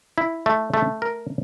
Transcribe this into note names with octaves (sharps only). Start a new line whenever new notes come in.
E4
A3
A3
A#4